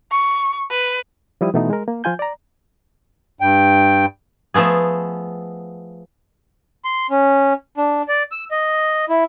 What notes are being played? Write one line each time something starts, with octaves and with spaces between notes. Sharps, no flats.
C#6
B4
F3 G3 E4 D#6
B2 E3 A3 B3 D#4
G#3 A#4
A#3
F3 F4 G#5 G6
D5 A#5
G2 G5
F3 A3 B3 G#4
C6
C#4
D4
D5
E6
D#5
E4